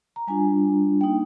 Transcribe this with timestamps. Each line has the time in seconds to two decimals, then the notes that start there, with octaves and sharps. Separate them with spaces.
0.16 A#5
0.27 G3 D4 F4 G#5
1.01 A#3 D#4 G5